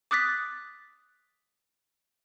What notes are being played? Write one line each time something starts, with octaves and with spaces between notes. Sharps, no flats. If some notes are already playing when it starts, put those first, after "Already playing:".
D6 D#6 F#6 A6 B6